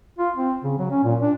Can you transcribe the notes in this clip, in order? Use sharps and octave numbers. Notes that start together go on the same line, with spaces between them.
F4
C4
C#3
F#3
C#4
A#2
D4